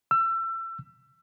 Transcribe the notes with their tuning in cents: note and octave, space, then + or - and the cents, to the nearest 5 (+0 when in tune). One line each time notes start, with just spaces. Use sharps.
E6 +30